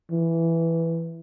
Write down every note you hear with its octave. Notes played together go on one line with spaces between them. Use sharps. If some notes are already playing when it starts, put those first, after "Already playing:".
E3